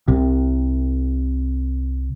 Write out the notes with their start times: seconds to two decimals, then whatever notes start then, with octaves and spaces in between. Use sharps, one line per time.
0.08 C2 C3